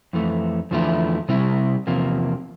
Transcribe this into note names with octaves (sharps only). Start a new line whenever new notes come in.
F2 E3 A3
E2 D3 F3 A3 E4
C3 G3 C4 E4
E2 C3 F3 A#3